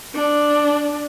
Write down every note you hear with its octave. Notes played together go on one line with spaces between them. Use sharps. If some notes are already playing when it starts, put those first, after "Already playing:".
D4